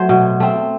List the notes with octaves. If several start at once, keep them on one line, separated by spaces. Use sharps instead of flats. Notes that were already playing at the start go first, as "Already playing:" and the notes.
Already playing: F#3 A3 C5
B2
A3 C4